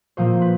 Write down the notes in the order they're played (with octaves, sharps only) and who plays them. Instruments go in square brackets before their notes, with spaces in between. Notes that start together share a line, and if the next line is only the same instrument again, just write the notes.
[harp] A#2 F3 A#3 C5
B4